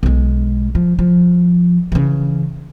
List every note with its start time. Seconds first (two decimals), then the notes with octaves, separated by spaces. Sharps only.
0.03 B1 G#3
0.75 F3
0.99 F3
1.92 C#3 E3